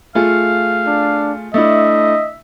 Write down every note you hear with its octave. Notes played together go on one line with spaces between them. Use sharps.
A3 F4 G#4 F5
D4
A3 D4 E4 D#5 E5